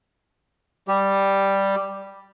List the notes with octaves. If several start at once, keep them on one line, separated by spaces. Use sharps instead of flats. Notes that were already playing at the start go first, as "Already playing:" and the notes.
G3 G4